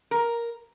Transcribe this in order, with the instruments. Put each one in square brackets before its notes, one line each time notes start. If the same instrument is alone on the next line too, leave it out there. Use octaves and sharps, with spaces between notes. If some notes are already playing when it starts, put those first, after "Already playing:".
[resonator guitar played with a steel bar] A#4